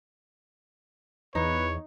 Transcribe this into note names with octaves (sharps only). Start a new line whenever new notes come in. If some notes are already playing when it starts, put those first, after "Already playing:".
E2 D#4 B4 C#5